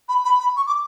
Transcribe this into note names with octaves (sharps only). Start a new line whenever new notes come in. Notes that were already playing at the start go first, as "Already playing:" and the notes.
B5
B5
B5
C#6
D6